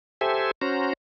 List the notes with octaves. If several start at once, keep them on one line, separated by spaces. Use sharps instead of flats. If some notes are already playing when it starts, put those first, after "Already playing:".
G4 A4 C5 E5 G#5
C#4 F#4 C5 A#5